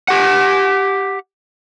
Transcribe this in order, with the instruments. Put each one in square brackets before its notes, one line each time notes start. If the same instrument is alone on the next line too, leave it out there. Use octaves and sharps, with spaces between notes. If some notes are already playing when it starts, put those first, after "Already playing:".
[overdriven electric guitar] G4 F#5